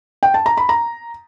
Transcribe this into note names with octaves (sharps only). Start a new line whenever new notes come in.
G5
A5
A#5
B5
A#5